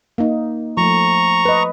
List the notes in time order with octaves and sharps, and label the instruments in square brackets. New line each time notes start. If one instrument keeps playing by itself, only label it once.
[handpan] A#3 D#4
[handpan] F3 A3 [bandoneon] A#5 C#6
[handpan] B4 D#5